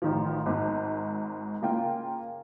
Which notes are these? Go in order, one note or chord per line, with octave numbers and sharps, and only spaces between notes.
A1 D#3 F3
G#1 G#2
C#3 A#3 F4 G5